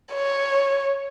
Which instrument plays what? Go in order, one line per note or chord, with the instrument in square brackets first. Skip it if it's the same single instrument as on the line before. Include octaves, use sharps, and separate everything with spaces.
[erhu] C#5